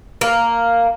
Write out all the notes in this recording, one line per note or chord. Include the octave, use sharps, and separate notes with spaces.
A#3